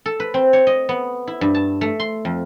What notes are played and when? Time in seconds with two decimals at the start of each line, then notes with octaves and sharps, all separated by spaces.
0.06 A4
0.20 B4
0.34 C4
0.53 C#5
0.67 D#5
0.89 B3
1.27 E4
1.41 G2
1.55 A5
1.81 A3
2.00 C6
2.25 F2